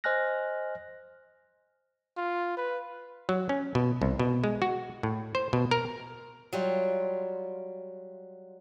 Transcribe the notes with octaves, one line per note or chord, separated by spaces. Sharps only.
C5 D#5 G#5 F6 F#6 A#6
F4
B4
F#3
C#4
B2
C2
B2
G#3
F#4
A2
C5
B2
A#4
F#3 G3 F4